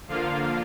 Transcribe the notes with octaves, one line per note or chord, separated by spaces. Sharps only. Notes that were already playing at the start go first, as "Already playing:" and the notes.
D3 F3 A#3 F4 F5